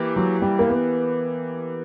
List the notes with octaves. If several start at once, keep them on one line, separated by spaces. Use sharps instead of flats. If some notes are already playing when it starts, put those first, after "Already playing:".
Already playing: E3 A#3 G4
F#3
G3
A#3
B3